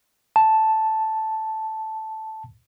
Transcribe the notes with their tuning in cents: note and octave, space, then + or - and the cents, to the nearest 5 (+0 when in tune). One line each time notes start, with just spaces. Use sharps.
A5 -5